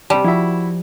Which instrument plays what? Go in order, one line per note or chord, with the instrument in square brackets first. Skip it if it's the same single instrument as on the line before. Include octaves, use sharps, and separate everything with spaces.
[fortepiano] C3 A5 [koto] G3
[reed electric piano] F3 [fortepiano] E4 F#4 E5